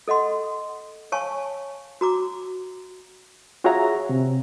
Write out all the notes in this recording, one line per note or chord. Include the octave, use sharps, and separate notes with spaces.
A4 D#5 F#5 C6
C#5 F5 G#5 A5 C#6
F#4 A#5 D6
F4 F#4 G#4 C#5 E5 A#5
C3